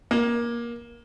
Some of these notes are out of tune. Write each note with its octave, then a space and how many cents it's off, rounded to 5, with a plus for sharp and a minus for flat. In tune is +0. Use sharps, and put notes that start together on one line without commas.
A#3 +20